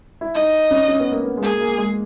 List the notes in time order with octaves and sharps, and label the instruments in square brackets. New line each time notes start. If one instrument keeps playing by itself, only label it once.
[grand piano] E4
[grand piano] D#4 [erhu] D#5
[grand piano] C#4
C#4
B3
A#3
B3
G#3
[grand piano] A#3 [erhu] G#4
[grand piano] A#3
G#3